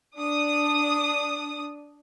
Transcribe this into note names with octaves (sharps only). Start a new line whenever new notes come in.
D4 D#6